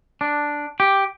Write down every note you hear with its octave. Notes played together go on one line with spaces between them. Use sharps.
D4
G4